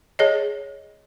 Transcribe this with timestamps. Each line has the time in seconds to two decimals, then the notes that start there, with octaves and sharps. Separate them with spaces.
0.19 G#4 C#5 D#5